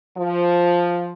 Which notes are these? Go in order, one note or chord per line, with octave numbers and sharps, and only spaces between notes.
F3